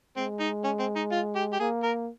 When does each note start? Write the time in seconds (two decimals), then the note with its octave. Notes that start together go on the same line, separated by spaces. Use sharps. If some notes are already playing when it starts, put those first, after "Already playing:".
0.17 G#3 C4
0.40 D#4
0.64 C#4
0.80 C4
0.96 D#4
1.12 F4
1.35 G4
1.53 G4
1.60 A#3 G#4
1.83 A#4